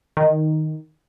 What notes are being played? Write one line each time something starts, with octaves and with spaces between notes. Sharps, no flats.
D#3